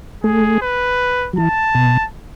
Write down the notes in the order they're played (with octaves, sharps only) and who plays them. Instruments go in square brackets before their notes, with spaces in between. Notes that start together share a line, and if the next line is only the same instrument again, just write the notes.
[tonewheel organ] A3 [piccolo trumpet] G#4
[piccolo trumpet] B4
[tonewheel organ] F#3
[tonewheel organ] E3 [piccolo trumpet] A5
[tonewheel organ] B2